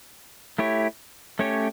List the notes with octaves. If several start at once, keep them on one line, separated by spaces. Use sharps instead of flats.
A3 E4 G4 C#5
A3 C#4 G4 C#5